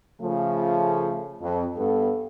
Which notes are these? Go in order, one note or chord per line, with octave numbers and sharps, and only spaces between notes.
C#3 F3 A3
F2
G2 B3 A4